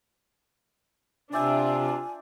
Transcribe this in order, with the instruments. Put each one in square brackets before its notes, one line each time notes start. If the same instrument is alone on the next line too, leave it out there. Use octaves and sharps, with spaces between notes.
[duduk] C3 [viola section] D4 F4 [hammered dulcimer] D5 E5 G5 [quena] G#5